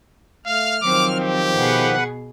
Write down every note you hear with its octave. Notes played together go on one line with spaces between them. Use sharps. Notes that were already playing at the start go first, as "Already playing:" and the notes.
A3 F5 F6
D#3 F3 F#3 C4 D6
G4
B2 G#4 B4 F#5